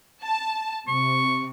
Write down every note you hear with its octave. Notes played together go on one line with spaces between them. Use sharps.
A5
C3 C#6